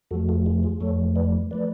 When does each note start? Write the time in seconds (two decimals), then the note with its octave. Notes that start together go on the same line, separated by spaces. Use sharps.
0.11 F2 F3 A3 F#4 A4
0.29 F#4 A4
0.46 F4 G#4
0.63 F4 G#4
0.80 F2 F3 A3 A4 C#5
1.16 B4 D5
1.51 F3 A3 B4 D5